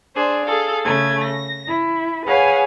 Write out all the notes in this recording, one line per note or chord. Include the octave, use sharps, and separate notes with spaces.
D4 G#4 C5
G#4 A4 F5
C#3 A3 G#6
A#6
E4
G#4 B4 C#5 F5 F#5 G#5